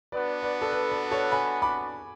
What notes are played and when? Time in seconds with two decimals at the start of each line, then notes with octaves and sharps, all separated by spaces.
0.12 B3 D4 F#4 B4 D5
0.42 B4 D5
0.62 A4
0.73 B4
0.92 B4
1.11 A4 C#5
1.32 G#5 B5
1.62 B5 D6